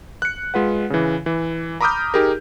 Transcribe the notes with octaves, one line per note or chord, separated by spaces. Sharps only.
F#6 C#7
G#3 F4 B4 F#5
C#3 E3
E3
A#5 B5 D6 D#6 F6 G6
D#4 G4 G#4 A#4